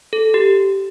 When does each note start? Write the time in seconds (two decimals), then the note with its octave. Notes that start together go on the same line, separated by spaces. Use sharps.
0.13 A4
0.34 G4